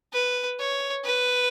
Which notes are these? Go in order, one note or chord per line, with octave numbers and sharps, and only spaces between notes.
B4
C#5
B4